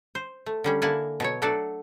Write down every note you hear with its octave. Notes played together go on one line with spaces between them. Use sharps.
C5
A3
D3 G3 C#4
D3 A#3 E4 F#5 G#5 A5
B2 F#3 C#5
F#3 A3 D4 F#4 A4 D5